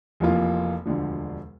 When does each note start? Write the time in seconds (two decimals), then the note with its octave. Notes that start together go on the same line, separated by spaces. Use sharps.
0.20 F1 F2 E3 A#3 F4
0.85 E1 D2 D3 F3